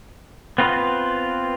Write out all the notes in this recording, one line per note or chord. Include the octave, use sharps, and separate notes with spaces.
B3 C4 F4 B4